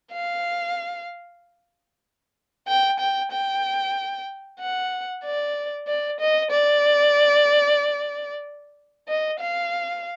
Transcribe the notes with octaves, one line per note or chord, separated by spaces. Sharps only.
F5
G5
G5
G5
F#5
D5
D5
D#5
D5
D#5
F5